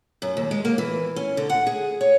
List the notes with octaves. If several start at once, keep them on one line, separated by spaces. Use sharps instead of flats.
F#2
D#2
G#3
A#3
E3
C#4
D3
F#5
G#4
C#5